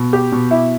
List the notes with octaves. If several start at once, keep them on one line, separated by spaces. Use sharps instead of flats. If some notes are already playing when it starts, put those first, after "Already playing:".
Already playing: B2
G4
B2
E4